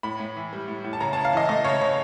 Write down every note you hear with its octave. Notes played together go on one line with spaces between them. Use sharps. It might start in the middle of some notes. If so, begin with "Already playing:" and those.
A2 B5
A2
E3
G3
A2
A2
A5
C#3 A#5
A5
C#3
F5
E3 D#5
A3 D#5
C#3 C#5
C#3 C#5